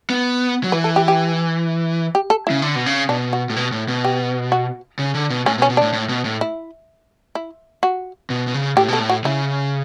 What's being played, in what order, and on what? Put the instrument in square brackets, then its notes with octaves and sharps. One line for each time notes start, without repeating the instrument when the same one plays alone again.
[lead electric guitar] B3
F#3
[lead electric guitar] E3 [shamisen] B4
[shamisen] A4
G4
G4
G4
A4
[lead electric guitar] C#3 [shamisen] E4
[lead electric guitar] D3
B2
C#3
[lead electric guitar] B2 [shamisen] D4
[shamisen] F#4
[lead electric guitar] A2
B2
A2
B2
[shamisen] G4
F#4
[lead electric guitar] C#3
D3
B2
[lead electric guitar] A2 [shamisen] C#4
[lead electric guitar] B2
[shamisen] C#4
[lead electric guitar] B2
[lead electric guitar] A2 [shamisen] D4
[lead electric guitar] A2
B2
A2
[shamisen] E4
E4
F#4
[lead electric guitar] B2
B2
C#3
[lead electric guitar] A2 [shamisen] G4
[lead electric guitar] B2 [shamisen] A4
[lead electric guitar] A2
[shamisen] F#4
[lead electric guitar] C#3 [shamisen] E4